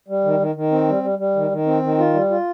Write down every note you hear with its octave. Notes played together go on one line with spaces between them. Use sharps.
G3
D#3
D#3
D#3
C4
G3
G3
G3
D#3
D#3
C4
D#3
F4
G3
F4